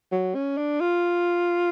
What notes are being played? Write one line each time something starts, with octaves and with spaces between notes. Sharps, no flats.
F#3
C#4
D4
F4